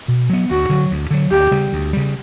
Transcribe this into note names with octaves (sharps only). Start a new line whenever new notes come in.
B2
F#3 B3
D2 F#4
D3 F#3
D2
D3 F#3
D2 G4
C#3 G3
D2
C#3 G3